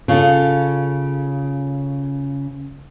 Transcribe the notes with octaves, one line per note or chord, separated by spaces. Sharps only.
C#3 F4 A4